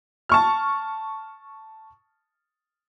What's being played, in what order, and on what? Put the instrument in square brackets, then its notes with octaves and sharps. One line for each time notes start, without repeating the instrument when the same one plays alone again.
[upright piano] A5 C#6 F6